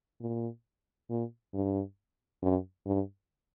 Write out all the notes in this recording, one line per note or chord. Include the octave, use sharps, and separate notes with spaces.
A#2
A#2
G2
F#2
G2